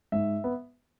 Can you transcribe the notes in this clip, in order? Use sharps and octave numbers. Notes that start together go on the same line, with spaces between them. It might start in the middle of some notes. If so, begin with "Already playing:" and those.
G#2 E5
B3